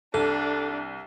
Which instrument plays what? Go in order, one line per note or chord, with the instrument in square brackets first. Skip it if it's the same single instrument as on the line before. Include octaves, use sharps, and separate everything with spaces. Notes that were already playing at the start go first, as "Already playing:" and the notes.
[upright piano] C2 [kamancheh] D4 [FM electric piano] A4